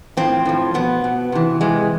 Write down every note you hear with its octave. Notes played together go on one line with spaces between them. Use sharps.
A2 F3 C4
A2 F3
B2 B3
B2
C3 E3
C3 E3 G#3